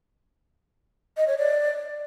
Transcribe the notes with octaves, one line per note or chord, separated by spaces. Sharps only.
D#5
C#5
D5